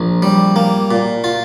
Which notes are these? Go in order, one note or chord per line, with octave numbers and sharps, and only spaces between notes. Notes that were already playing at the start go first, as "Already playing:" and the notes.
Already playing: A#1
G3
A#3
A#2
F4